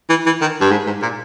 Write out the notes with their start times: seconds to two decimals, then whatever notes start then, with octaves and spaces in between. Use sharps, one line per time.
0.10 E3
0.26 E3
0.41 D#3
0.61 G2
0.71 G#2
0.87 G#2
1.02 A#2